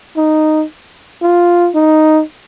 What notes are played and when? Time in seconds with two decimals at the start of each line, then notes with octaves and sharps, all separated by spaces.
0.17 D#4
1.22 F4
1.75 D#4